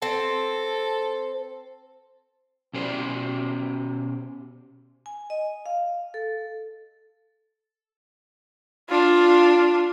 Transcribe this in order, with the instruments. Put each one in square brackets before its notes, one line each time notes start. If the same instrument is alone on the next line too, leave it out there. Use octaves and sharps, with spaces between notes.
[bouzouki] C4 [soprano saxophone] A4
[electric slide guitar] B2 C#4 G4 C5 D5
[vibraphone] G#5
D#5
F5
A4
[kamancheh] D4 F4